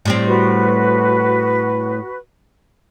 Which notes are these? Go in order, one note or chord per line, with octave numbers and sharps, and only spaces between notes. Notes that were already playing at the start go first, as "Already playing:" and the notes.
A2 G3 C4
F#4 B4